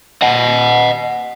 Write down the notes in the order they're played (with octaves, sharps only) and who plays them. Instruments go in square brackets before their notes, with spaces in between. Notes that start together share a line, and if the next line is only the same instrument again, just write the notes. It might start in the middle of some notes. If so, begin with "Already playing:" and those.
[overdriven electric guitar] D#5 F#5